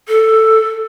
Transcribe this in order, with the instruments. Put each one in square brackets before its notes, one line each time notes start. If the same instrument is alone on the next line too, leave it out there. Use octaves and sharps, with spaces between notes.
[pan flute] A4